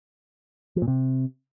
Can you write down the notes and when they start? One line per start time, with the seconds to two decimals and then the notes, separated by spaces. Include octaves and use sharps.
0.76 F3
0.82 A#2
0.88 C3